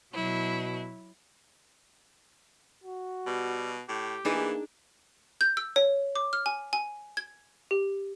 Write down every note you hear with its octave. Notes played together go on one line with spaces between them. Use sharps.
B2 F#3 E4
F#4
B2 G3
A2 G4
E3 A#3 D4 D#4 G#4
G6
E6
C#5
D6
F6
G#5
G#5
G#6
G4